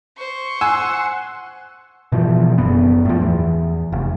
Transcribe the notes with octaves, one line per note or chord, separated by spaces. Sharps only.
C5 C#6
F#5 G#5 C6 E6
B2 E3 F3
F#1 F#2 B3
A2 F3
E2
F1